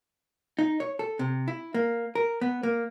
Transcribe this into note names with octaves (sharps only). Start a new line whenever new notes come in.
D#4
C#5
A4
C3
E4
A#3
A#4
B3
A#3